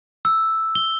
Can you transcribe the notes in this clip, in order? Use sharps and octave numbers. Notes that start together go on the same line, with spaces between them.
E6
G7